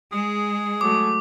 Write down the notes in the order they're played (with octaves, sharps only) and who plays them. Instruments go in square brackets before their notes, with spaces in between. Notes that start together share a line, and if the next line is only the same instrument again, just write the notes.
[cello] G#3 [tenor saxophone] G#4
[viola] F#3 A3 [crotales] D6